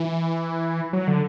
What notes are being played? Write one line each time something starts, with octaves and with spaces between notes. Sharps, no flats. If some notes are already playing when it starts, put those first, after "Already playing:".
Already playing: E3
F#3
D3